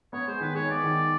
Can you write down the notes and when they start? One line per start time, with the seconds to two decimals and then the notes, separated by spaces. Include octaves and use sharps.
0.13 B3 C#5
0.27 G#3 C5
0.41 D#3 B4
0.55 G#3 C#5
0.70 B3 D5
0.84 D#3